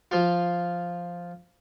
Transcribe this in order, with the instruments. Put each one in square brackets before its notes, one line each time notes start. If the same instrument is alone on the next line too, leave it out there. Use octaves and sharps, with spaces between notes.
[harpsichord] F3 F4